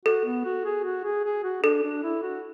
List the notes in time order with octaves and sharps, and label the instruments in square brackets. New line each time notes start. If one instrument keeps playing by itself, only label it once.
[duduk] F#4 [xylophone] A4
[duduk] B3
F#4
G#4
F#4
G#4
G#4
F#4
[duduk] D4 [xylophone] A4
[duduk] D4
E4
F#4